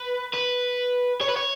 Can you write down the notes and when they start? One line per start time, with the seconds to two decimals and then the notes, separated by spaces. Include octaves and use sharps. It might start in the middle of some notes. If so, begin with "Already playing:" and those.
Already playing: B4
0.34 B4
1.21 C#5
1.29 B4
1.36 C#5